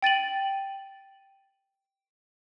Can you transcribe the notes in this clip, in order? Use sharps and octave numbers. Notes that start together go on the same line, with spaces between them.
G5 A6 D#7 F#7